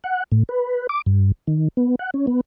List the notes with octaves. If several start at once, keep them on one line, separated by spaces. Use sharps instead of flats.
F#5
A2
B4
D6
G2
D#3
B3
F#5
C#4
B3